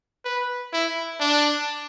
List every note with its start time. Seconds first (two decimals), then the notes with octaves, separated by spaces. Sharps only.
0.25 B4
0.73 E4
1.21 D4